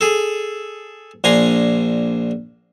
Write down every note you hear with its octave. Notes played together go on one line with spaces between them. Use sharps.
G#4 A4
A#1 D4 G#5 A#5 C6